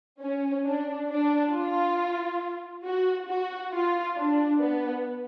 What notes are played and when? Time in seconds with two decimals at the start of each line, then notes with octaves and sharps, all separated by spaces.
0.22 C#4
0.66 D4
1.10 D4
1.53 F4
2.85 F#4
3.28 F#4
3.73 F4
4.16 D4
4.60 B3